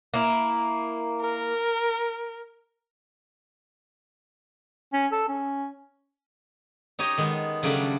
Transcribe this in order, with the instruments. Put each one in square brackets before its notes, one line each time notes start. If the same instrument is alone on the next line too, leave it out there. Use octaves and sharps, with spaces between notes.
[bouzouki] A#3 E4
[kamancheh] A#4
[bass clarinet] C#4
A4
C#4
[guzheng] D#4 G4 C#5 D#5
D#3 G#3 B3
C#3 F#3 G3 A3 D4